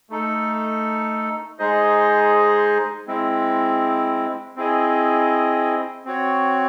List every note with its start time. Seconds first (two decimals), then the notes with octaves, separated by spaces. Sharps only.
0.10 A3 D#4 A4
1.59 G#3 D#4 G#4 C5 D#5
3.07 G#3 C4 E4
4.56 C4 E4 G#4 D#5
6.05 C4 F#4 C#5